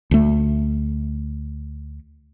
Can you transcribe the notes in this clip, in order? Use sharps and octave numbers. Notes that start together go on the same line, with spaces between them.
D2 A3